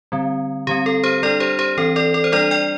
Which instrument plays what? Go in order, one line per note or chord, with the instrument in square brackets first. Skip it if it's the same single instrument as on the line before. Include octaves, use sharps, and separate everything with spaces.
[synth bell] D3 G3 C4
D3 G3 C4 G4
A4
G4 C5
G3 D4 A4 D5
G4 C5
G4 C5
E3 C4 A4
A4 D5
A4 D5
C5
G3 D4 A4 D5
D5 G5